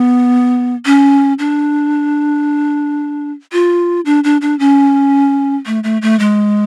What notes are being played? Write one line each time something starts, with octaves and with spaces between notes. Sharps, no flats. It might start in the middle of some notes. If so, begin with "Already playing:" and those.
Already playing: B3
C#4
D4
F4
D4
D4
D4
C#4
A3
A3
A3
G#3